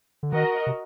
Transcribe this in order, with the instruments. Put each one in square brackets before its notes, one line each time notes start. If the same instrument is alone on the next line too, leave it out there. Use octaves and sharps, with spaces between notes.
[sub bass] D3
[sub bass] D#3 [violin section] F#4 A#4 D#5
[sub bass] C3